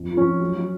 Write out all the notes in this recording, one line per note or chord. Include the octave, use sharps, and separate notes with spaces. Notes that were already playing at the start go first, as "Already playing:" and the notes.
Already playing: F2
F3
C#4
F3
F#3
F#3